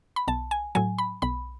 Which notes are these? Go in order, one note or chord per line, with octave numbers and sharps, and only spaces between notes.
B5
B1 A5
G#5
A2 F#3 G#5
B5
B1 B5